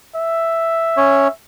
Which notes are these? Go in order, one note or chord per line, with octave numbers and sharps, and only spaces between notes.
E5
C#4 C#5